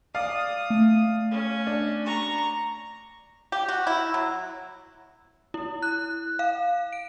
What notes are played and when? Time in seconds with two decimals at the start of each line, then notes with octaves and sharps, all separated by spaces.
0.15 D5 F5 D#6
0.70 A3
1.31 C#4
1.67 D4
2.05 A#5 C#6
3.52 G4
3.68 F#4
3.87 E4
4.14 F#3
5.54 E4
5.83 F#6
6.39 F5
6.93 D7